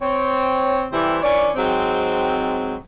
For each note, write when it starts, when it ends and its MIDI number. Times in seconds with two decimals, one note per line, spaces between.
0.01 0.84 60
0.01 0.84 73
0.92 1.17 48
0.92 1.17 52
0.92 1.17 55
0.92 1.17 57
0.92 1.17 64
0.92 1.17 72
1.23 1.49 52
1.23 1.49 61
1.23 1.49 62
1.23 1.49 73
1.23 1.49 74
1.55 2.73 44
1.55 2.73 54
1.55 2.73 56
1.55 2.73 60